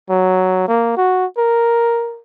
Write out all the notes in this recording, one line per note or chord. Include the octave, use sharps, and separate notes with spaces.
F#3
A#3
F#4
A#4